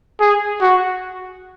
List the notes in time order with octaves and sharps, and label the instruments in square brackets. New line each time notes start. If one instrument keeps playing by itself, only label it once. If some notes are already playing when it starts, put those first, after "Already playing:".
[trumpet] G#4
F#4